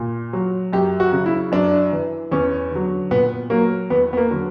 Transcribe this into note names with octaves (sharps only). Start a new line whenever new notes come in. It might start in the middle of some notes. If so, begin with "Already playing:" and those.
Already playing: A#2
F#3
F#2 G4
F#4
C#3 F#3
E4
F#2 D4
E3
E2 C#4
D3 F#3
A#2 B3
F#3 A#3
E2 B3
B3
A#3
D3 F#3